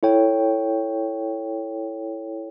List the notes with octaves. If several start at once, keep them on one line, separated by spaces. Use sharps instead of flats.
E4 A4 C#5 G5